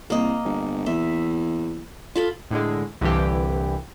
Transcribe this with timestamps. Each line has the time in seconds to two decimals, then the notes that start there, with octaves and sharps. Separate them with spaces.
0.10 C2 A#3 D#5
0.44 G1
0.86 E2 E5
2.16 F4 A4 B5
2.51 A2 D3 G#3
3.01 C2 G2 D3 E3 G4